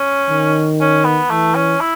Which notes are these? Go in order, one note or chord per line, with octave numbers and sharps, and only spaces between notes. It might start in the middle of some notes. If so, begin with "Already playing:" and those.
Already playing: C#4
D#3
C#4
B3
E3 A3
C#4
E4